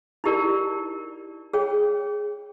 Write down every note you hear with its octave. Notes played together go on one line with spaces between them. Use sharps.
D#4 E4 G4 A#4 D5
G#4 C#5 G5